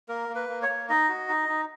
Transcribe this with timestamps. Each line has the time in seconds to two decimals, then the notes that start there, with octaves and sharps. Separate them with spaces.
0.09 A#3 A#4
0.29 A#3
0.35 B4
0.49 A#3
0.62 C#5
0.69 A#3
0.89 D#4 D#5
1.09 F#4
1.29 D#4
1.49 D#4